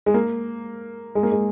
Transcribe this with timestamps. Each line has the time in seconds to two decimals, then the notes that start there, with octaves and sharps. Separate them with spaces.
0.06 G#3
0.14 A#3
1.15 G#3
1.23 A#3
1.32 G#3